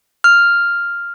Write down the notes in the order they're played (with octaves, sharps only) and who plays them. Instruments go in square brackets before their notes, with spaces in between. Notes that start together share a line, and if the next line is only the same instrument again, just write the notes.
[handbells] F6